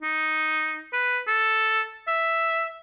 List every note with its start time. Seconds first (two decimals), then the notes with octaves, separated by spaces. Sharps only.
0.02 D#4
0.93 B4
1.28 A4
2.08 E5